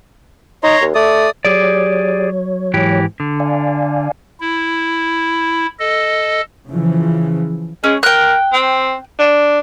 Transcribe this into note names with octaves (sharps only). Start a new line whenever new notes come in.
D#4 C#5 A#5 C6
D#2
A3 D5 D#6
F#3 G4 G#4 C#5 D5
G#2 E3 G4
D3
D5 F5 G#5
E4
A4 D#5
C#3 E3 F3
G#3 C#4
A#4 G5 F#6
C4
D4